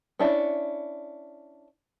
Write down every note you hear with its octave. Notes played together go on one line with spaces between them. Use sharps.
C#4 D4 E4